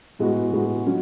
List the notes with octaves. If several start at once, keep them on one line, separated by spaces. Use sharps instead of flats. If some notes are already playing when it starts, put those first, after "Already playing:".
A2 G#3 B3 F#4
A2 G#3 B3 F#4
F#3 C#4 F#4